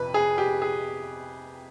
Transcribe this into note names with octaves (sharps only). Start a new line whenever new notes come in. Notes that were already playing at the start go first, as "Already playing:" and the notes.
Already playing: F2 C3 B4
G#4
G4
G#4